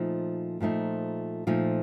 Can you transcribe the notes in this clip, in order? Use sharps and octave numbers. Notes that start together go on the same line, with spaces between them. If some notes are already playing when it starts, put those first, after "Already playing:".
Already playing: A#2 F3 A3 D#4
A#2 F3 A3 D#4
A#2 F3 A3 D#4